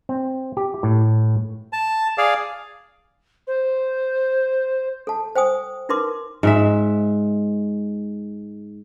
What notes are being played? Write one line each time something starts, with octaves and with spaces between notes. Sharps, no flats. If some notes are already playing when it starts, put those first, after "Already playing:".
C4
G4
A2
A5
G#4 D5 F5
C5
A4 A5
C5 G5 G#5 D#6
D#4 E4 A#4 B4 C6 D6
G#2 G#3 E5